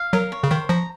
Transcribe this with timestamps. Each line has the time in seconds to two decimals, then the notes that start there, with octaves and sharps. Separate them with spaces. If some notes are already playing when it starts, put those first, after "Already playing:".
Already playing: F5
0.13 F#3 A#4
0.32 C#5
0.43 C#3
0.51 D#3 C5
0.69 F3 A#5